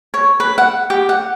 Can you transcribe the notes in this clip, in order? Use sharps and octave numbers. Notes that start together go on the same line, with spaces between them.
C#5
B4
F#5
G4
F#5